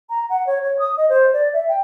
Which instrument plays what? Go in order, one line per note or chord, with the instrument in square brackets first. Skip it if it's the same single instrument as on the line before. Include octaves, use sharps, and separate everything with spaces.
[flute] A#5
F#5
C#5
C#5
D#6
D#5
C5
D5
E5
G5